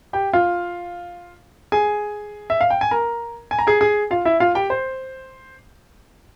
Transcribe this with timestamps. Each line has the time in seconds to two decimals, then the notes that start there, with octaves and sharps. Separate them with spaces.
0.13 G4 G5
0.33 F4 F5
1.72 G#4 G#5
2.50 E5
2.61 F5
2.70 G5
2.81 G#5
2.91 A#4 A#5
3.51 G#5
3.59 A#5
3.67 G#4 G#5
3.81 G#4 G#5
4.11 F4 F5
4.25 E4 E5
4.40 F4 F5
4.55 G4 G5
4.70 C5